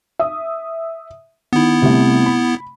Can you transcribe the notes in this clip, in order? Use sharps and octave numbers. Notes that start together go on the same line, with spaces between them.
E5 D#6
D#3 B3 E4
C3 G3 A3
B5